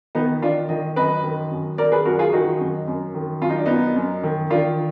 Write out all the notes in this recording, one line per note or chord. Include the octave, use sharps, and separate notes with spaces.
D#3 B3 D#4
D#3 D4 F4
D#3 D#5
F#2 B4 D#5
D#3
F#2
D#3 A#4 D5
G#4 B4
F#2 F#4 A#4
F4 G#4
D#3 D#4 F#4
F#2
F#2
D#3
F#2 F4
D#4
D4
F#2 B3 D#4
F#2
D#3
D#3 D4 F4